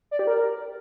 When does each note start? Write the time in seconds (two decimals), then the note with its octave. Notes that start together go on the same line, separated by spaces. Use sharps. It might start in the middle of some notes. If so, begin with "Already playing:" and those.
0.11 D5
0.19 G4
0.27 A#4